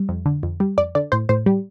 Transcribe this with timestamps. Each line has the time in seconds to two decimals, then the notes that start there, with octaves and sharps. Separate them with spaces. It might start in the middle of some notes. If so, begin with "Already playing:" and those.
Already playing: G3
0.09 F2
0.26 D3
0.43 F2
0.60 G3
0.78 F2 D5
0.95 D3 D5
1.12 A2 C5
1.29 A2 C5
1.46 G3